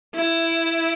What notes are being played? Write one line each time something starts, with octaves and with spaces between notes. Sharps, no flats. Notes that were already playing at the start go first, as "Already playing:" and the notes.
E4